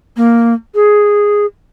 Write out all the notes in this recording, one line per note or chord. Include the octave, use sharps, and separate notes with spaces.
A#3
G#4